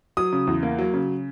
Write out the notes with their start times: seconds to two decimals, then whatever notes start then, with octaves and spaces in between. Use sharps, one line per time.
0.17 F#3 D#6
0.32 C#3
0.47 E2
0.63 A#3
0.79 F#3
0.94 C#3